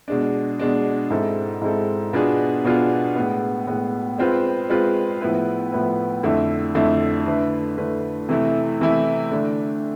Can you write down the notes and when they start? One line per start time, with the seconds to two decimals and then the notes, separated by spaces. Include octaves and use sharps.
0.08 B2 G#3 D4
0.59 B2 G#3 D4
1.11 G#2 G#3 C4 E4 A4
1.62 G#2 G#3 C4 E4 A4
2.13 B2 B3 D4 F4 G#4
2.64 B2 B3 D4 F4 G#4
3.16 A2 G#3 B3
3.67 A2 G#3 B3
4.18 G#3 C4 F4 B4
4.69 G#3 C4 F4 B4
5.21 A2 F3 B3 E4 B4
5.72 A2 F3 B3 E4 B4
6.23 F2 D3 A3 E4
6.75 F2 D3 A3 E4
7.26 D3 A3 E4 B4
7.78 D3 A3 E4 B4
8.29 C3 E3 A3 E4
8.80 C3 E3 A3 E4
9.31 D3 A3 D4